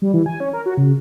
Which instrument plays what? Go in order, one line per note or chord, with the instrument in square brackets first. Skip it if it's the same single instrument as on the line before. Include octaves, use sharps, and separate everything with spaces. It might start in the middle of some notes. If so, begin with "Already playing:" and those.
[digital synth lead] G3
E3
G#5
C#4
A#4
F#4
C#3